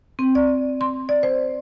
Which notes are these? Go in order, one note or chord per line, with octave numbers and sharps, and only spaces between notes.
C4
D5
C6
D5
C5